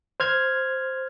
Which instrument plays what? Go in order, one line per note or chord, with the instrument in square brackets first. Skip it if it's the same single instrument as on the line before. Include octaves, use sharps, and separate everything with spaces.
[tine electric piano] C5 F6 G#6